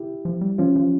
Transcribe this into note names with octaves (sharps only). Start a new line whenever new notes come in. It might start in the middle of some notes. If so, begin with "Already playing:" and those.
Already playing: E4 G4
F3
G3
F3 C#4 F4
F3